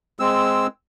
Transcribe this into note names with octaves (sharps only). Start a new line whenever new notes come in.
G#3 C4 E6